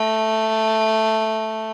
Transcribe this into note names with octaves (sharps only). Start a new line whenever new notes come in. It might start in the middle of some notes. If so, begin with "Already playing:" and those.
Already playing: A3